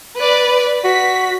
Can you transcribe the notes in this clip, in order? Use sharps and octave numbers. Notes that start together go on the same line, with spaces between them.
B4 D5
F#4 B6